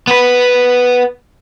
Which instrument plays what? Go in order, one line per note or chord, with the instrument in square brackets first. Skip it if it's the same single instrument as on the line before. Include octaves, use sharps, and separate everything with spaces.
[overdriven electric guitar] B3 B4